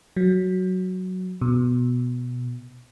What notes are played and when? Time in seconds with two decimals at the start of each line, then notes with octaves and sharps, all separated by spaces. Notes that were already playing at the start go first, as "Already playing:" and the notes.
0.16 F#3
1.41 B2